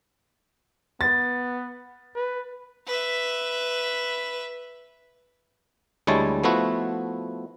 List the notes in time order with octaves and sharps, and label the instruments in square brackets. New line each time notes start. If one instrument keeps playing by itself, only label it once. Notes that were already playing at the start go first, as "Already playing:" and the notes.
[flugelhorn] B3 [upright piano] A6
[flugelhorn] B4
[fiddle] B4 E5
[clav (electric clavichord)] D2 G3 G#3 E4 C#5 A5
F3 A3 B3 E4 F#4